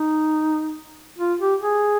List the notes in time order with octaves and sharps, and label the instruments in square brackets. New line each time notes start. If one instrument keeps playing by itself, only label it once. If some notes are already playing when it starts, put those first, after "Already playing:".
Already playing: [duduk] D#4
F4
G4
G#4